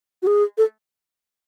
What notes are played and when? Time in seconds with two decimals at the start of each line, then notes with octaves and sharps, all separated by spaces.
0.23 F#4
0.27 G#4
0.58 A4